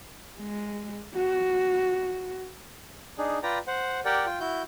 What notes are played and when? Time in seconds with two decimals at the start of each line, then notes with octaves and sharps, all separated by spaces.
0.39 G#3
1.14 F#4
3.18 D4 D#4 G#4
3.43 F4 B4 D5 G5 A#5
3.67 C5 F#5
4.05 G4 A#4 D5 F#5 G5
4.26 F4 G5
4.40 E4 F#4 G6